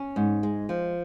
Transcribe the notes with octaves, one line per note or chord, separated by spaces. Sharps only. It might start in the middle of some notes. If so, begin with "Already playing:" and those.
Already playing: C#4
G#2
G#3
F3